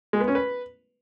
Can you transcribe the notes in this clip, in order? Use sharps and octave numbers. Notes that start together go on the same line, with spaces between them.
G#3
B3
C#4
B4